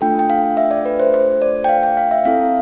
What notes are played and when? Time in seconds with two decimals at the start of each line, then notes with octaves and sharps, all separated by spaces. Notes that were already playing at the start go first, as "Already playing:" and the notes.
0.01 A3 D4 F4 A4 G5
0.19 G5
0.30 F5
0.57 E5
0.71 D5
0.85 B4
1.00 C5
1.14 C5
1.42 D5
1.64 G5
1.69 F5
1.83 G5
1.97 F5
2.11 E5
2.25 C4 E4 A4 F5